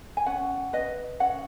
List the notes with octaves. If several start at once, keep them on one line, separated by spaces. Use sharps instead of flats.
G#5
C#4 F#5
B4 D#5
C#4 F#5